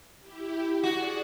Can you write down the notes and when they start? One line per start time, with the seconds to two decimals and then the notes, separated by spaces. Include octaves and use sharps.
0.20 E4 G4
0.83 F#4 G#4 D5 F#5